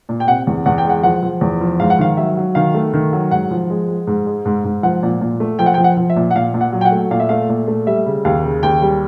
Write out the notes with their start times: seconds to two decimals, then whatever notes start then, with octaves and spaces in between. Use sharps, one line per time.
0.09 A#2
0.20 G5
0.27 C3 F#5
0.47 E2
0.66 E2 F#5
0.78 G5
0.84 G#3
0.89 F#5
1.03 F3 F#5
1.23 F3
1.41 E2
1.61 F3
1.80 G#2 F5
1.90 F#5
1.99 D#3 F5
2.17 F#3 E5
2.37 F#3
2.55 D#3 F5
2.74 A3
2.94 D#3
3.13 F#3
3.31 G#2 F#5
3.51 F3
3.70 G#3
3.88 G#3
4.07 G#2
4.27 G#3
4.45 G#2
4.64 G#2
4.83 F3 F#5
5.03 A#2
5.21 A#2
5.40 A3
5.59 F3 G5
5.66 F#5
5.74 G5
5.78 F3
5.84 F#5
5.97 F3
6.10 E5
6.16 A#2
6.31 F#5
6.35 A#2 F5
6.54 A#2
6.61 F#5
6.73 F#3
6.81 G5
6.85 F#5
6.92 A3
7.11 A#2 F5
7.20 E5
7.29 A3 F5
7.49 A#2
7.68 A3
7.87 G3 E5
8.06 C#3
8.25 D#2 F5
8.44 C#3
8.63 D#2 G5
8.82 G3